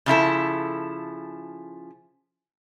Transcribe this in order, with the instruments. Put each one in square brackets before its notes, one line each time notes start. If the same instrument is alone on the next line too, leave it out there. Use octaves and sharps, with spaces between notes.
[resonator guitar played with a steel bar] C#3 F3 E4 A4